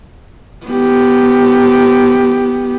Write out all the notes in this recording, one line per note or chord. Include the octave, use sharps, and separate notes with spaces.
B3 G4